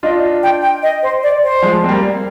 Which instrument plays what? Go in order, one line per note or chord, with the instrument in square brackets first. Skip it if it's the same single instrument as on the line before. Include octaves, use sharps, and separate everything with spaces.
[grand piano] D4 F4 [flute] D#5
[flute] G5
G5
D#5
C5
D5
C5
[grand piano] F3 G#3
C4
G3 A#3